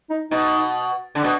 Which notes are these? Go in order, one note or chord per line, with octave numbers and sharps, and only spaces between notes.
D#4
B2 D#4
D3 D4
B2